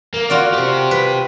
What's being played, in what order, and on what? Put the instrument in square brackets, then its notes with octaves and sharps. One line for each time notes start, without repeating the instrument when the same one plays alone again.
[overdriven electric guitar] A#3
[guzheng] F4 F#4 D5
[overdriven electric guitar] G4 C5
[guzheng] B4